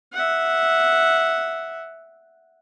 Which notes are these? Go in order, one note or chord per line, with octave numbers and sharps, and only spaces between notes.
E5 F#5